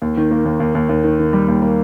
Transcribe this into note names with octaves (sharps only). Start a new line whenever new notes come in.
D#2
D#3
A#3
D#2
D#2
D#2
D#2
D#3
D#3
G3
D#2
A#3